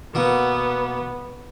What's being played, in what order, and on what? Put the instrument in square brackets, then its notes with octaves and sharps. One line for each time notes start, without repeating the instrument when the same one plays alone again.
[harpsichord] B2 A#3 [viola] B3